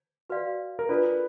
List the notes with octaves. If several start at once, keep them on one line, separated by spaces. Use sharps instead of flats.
F#4 B4 D5 F5
A#4
D4 F4 A4 B4 D5